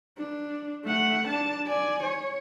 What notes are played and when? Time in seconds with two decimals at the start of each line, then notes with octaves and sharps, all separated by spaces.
0.18 D4
0.85 A3 F#5
1.28 D4 A5
1.67 D5 G#5
2.03 C#5